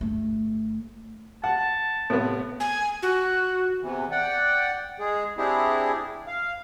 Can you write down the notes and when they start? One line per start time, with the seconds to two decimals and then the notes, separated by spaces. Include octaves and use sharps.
0.01 G1 A3
1.44 F#5 A5
2.10 A2 C3 B3
2.60 G#5
3.02 F#4
3.81 E2 C3 E3
4.12 D5 F#5 G5
5.00 G#3 G#4
5.38 C4 D4 E4 G4 G#4
6.27 F5